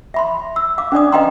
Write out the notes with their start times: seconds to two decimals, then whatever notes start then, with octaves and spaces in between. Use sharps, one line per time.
0.14 E5 B5 C6
0.56 E6
0.78 F5 D6
0.92 C#4 D4 D5 D#6
1.12 B4 D#5 F5 G5 A#5 C6